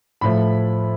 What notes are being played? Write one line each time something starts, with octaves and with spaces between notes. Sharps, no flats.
A2 F3 A3 B5